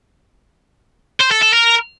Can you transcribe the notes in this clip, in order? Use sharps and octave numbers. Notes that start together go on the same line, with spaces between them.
C5
A4
A4
A#4